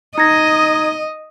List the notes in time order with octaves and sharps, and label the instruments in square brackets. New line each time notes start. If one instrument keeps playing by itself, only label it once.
[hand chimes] D#4 [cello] D#5 [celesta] A#5 G#6 A#6 [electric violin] D#6